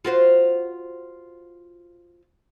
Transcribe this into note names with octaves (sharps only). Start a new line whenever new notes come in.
F4 F#4 C5